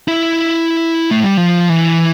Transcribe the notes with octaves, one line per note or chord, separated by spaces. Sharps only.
E4
A3
G3
F3
E3